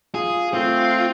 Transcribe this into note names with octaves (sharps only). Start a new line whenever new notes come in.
F4 G#4
A3 C4 F4